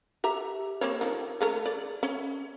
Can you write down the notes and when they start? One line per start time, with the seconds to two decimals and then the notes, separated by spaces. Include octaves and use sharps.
0.24 G4 E5 A#5
0.81 A#3 C4 C#5
1.01 D#3 F3
1.41 C#3 A3 A#4
1.66 D5
2.03 C#4